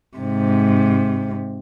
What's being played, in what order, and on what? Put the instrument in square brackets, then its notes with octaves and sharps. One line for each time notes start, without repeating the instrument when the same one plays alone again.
[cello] G#2 C3